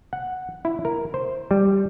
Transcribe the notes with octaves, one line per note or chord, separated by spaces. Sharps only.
F#5
E4
A#4
C5
G3